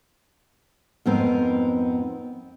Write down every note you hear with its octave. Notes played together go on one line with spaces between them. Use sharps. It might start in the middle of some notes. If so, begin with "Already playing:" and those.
F2 G#2 B3 C4 A#4